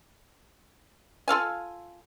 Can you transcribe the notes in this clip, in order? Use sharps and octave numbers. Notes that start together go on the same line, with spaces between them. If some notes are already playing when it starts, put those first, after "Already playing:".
F4 A4 F5 G#5